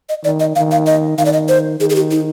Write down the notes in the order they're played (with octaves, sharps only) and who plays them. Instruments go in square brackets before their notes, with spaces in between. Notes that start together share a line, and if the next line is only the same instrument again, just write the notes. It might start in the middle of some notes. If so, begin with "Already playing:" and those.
[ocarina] D#5
[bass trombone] D#3 [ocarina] D5
[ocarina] D#5
[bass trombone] D#3 [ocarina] F5
[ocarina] F5
D#5
[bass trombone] D#3 [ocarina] F5
[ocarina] D5
D#5
C5
[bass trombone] D#3 [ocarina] G#4
[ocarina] G#4
G4
D#4